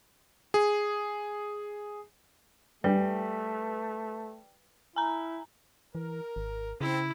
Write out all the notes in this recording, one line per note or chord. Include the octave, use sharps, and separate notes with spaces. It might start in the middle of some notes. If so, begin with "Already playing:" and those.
G#4
G3 A3 B4
E4 G#5 A#5
E3 A#4
G#1
C#3 C4 E4